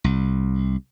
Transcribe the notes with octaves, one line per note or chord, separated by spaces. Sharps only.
C2